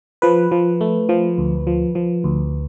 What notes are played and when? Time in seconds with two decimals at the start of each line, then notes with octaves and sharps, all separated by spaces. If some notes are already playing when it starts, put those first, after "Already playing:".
0.22 F3 B4
0.51 F3
0.81 A3
1.09 F3
1.38 D2
1.67 F3
1.95 F3
2.24 D2